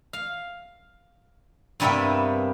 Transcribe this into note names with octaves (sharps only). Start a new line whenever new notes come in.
F5
G2 C3 G3 A#3 B3 E5